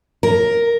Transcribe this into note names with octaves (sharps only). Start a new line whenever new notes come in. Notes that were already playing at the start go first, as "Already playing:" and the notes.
A#4